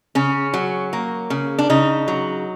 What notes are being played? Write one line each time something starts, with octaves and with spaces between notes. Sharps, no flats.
C#3 C#4
F#3
A#3
C#3
D4
C#3 D#4
F#3